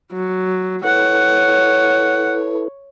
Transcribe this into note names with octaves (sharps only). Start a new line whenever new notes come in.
F#3
E4 A4 B4 C#5 F#5